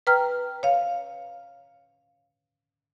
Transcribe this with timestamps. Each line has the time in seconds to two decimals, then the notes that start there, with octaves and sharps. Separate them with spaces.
0.07 B4 G5 A#5 F6
0.63 C#5 F5